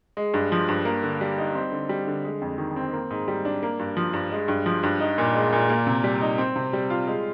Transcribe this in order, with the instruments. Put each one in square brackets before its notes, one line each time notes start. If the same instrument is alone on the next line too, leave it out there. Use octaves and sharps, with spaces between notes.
[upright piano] G#3
G2
F3
G2
A#3
D3
G3
D#4
C4
D3
G3
D3
G#3
F2
D#3
C4
A#3
G#2
G3
D4
A#3
G2
F3
G2
G#3
G2
F3
G2
D#4
A#2
G#3
A#2
A#3
C3
G3
D#4
C4
C3
G3
F4
G#3